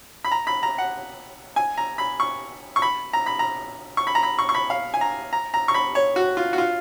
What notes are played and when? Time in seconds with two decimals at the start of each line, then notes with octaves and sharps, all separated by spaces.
0.24 B5
0.31 A#5
0.47 B5
0.63 A#5
0.78 F#5
1.56 G#5
1.77 A#5
1.98 B5
2.20 C#6
2.76 C#6
2.82 B5
3.13 A#5
3.26 B5
3.39 A#5
3.97 C#6
4.07 B5
4.15 A#5
4.23 B5
4.39 C#6
4.49 C#6
4.55 B5
4.70 F5
4.94 G#5
5.01 A#5
5.33 A#5
5.54 A#5
5.68 C#6
5.74 B5
5.95 C#5
6.16 F#4
6.37 F4
6.53 F#4
6.58 F4